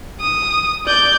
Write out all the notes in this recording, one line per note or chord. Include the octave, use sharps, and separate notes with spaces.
D#6
D5 G6